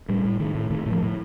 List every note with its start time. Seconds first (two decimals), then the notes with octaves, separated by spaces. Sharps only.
0.09 A2 G3
0.25 A2
0.39 A2 D#3
0.55 A2
0.70 A2 D#3
0.86 A2
0.91 F3
1.02 A2